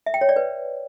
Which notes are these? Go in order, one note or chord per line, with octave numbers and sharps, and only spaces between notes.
E5
G5
C#5
D5
B4